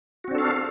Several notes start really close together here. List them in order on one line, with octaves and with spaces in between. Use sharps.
F#4 C4 D4 A4 F5